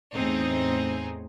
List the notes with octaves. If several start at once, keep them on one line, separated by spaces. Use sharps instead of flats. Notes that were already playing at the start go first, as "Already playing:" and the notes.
E2 A2 C4 D#4 G#4